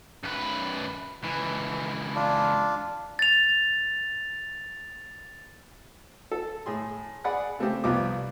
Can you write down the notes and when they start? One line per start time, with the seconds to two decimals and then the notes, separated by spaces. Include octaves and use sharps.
0.24 F#2 B4
1.23 C#2 E3
2.16 D4 F4
3.19 A6 F7
6.32 A4
6.66 A2 G#4 C6
7.24 G#4 D5 F#5 B5 F#6
7.59 C#3 A3 C4 G4
7.84 C2 F3 G3 B3 F4 D6